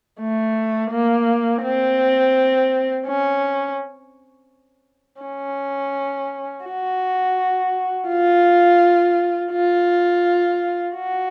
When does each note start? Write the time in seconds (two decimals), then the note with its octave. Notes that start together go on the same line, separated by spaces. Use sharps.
0.20 A3
0.91 A#3
1.63 C4
3.07 C#4
5.22 C#4
6.65 F#4
8.09 F4
9.52 F4
10.96 F#4